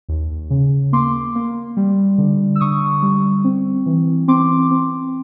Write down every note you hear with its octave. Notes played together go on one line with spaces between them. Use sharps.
D#2
C#3
A#3 C6 D6
A#3
G3
D3
E6
D3 C#6 D#6
G3
C4
E3
C4 C6 D6
C4